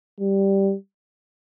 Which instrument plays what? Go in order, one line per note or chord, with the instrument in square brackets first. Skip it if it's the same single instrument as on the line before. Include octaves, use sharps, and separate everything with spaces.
[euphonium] G3